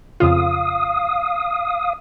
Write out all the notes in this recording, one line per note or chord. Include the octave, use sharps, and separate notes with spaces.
F2 C#3 F4 F5 D#6